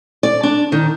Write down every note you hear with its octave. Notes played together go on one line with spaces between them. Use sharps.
D5
D4
D#3